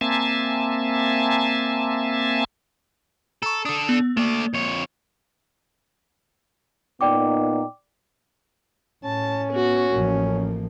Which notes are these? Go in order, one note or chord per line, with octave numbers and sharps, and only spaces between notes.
A#3 C4 E5 G#5 A5
A4 A#5 C#6
D4 A4 D#6
B3
A3 A#3 D5
F2 C#5
A#2 B3 D#4 D5 G5 D6
A2 C#4 A5
B3 F#4
A1 F3 A#3